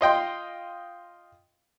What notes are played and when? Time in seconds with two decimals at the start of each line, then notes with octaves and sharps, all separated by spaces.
0.01 F4 D#5 G5 C6